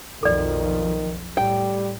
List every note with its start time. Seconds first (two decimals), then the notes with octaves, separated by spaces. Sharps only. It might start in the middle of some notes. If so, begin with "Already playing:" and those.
0.23 B1 F2 D#3 F3 A4 D5
1.37 A2 G3 G5